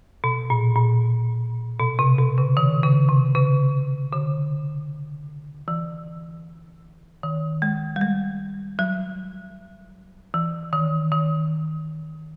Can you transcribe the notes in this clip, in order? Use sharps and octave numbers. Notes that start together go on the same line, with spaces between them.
B2
A#2
A#2
B2
C3
B2
C#3
D#3
C#3
C3
C#3
D3
E3
D#3
G#3
G3
G#3
F#3
E3
D#3
D#3